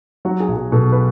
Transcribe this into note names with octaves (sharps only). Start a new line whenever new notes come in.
F#3 F#4
G#4
B1
G#4
B2 A4
B4